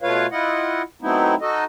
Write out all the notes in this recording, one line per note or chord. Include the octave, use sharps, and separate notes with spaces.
B2 A3 F4 B4 C#5 F5
E4 F4 D#5 F#5
F#3 A3 B3 C4 D#4 E4
D#4 F#4 A4 D#5